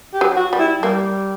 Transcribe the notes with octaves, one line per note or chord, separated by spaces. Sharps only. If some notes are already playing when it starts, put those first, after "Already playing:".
G4
F#3
F#4
G3
E4
G3 A#3